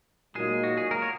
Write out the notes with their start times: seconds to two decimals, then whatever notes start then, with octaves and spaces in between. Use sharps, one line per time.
0.35 A#2 F#3 G#3 A#3 D#4 G#4
0.64 F#4
0.77 G#4
0.91 A#3 A#4
1.02 C#5